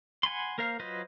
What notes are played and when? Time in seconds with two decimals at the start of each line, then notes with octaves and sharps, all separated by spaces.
0.23 F#5 G#5 B5 C6
0.58 A#3 A#4 C5 F5
0.80 F#3 F4 B4 C5 D#5